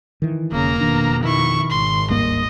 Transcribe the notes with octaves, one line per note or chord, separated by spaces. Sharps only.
D#3 E3
E1 C#3 A#3 A#5
E1 F2 B2 D#3 D4
D#3 E4 C#6
G#1 C6
D1 G2 A#3 D#5